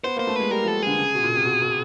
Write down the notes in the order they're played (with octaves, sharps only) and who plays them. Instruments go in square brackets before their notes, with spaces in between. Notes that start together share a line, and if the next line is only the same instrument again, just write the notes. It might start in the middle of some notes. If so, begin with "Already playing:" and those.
[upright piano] B3 [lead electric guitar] C5
[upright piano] A#3 [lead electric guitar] C5
[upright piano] A3
[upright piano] G#3 [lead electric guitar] B4
[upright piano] G3 [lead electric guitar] A#4
[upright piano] F3 [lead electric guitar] A4
[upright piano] D3 [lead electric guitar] G#4
[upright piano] C#3
B2
A#2
C3
B2
B2